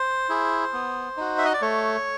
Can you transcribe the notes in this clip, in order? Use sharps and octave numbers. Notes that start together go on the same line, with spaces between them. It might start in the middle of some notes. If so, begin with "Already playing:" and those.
Already playing: C5
E4 G#4
B3
D#4 F#4
E5
D#5
D5
A3 C#5